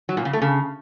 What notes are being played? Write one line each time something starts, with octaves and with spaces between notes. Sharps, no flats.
F#3
A#2
C#3
A3
C#3